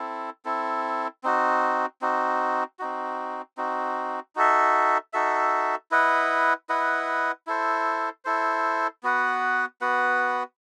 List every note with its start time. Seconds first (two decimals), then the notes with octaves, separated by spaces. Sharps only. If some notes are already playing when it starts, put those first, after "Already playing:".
Already playing: C4 E4 A4
0.45 C4 E4 A4
1.23 C4 D#4 F#4
2.01 C4 D#4 F#4
2.79 C4 D#4 F#4
3.57 C4 D#4 F#4
4.35 D#4 F#4 A4 E5
5.13 D#4 F#4 A4 E5
5.91 E4 B4 D#5 F#5
6.69 E4 B4 D#5 F#5
7.47 E4 A4 C5
8.25 E4 A4 C5
9.03 B3 F#4 B4 F#5
9.81 B3 F#4 B4 F#5